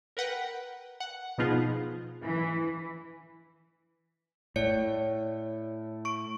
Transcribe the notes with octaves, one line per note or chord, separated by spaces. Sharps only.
A#4 B4 F#5 G5
F#5
B2 F3 B3 D#4 F4 G#4
E3
A2 C#5 D5 C#7
C#6 D7